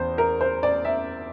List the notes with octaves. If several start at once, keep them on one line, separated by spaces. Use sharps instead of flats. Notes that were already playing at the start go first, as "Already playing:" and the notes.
Already playing: E2 C5
A#4
C5
D5
E5